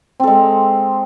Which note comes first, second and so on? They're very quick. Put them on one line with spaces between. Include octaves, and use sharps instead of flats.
C4 A4 G#3